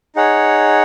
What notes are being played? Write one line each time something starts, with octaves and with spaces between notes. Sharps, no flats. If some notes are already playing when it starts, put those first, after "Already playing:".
D#4 G#4 C#5 F#5